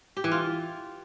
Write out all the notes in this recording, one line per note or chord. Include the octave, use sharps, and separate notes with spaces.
G4
E3
F4